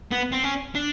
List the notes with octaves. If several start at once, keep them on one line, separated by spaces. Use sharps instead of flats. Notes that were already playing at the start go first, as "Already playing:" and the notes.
B3
C4
C#4
D4